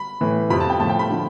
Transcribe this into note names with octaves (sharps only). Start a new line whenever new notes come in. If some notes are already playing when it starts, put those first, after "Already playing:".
Already playing: B5
A2 E3
F2 C3 F3 B5
A5
G5
A2 F3 A5
G5
B5
D3 F3